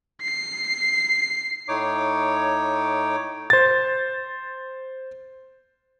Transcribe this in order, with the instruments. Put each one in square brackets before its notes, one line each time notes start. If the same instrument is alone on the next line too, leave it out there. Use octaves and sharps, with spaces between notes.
[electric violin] C7
[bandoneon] A2 D#4 C#5 D6
[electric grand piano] C5 A6